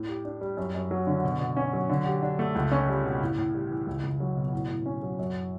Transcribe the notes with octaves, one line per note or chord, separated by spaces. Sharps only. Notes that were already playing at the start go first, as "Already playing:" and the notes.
Already playing: A2
G4
D4
G3
F#2
F#2
F#3
D3
B2
B2
C#4
F#3
D3
G4
D4
A3
C#2
C#4
G3
B2
A2
A2
G3
E3
C#2
C#2
F#3
B2
A2
A2
C#4
F#3
F#2